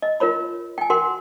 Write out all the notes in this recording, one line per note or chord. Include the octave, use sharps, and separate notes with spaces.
D#5
F4 A#4 C#5 B5
G5 G#5
F#4 A#4 F#5 C6